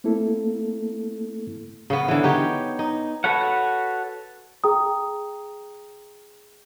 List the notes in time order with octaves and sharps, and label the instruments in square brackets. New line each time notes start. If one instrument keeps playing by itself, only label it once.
[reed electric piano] A3 A#3 C4 E4 A4
[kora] C#3 B3
D3 E3
D#4 G4 C#5
D#4
[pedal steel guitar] F#4 A4 B4 C#5 F#5
[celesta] G#4 G5 A#5 D#6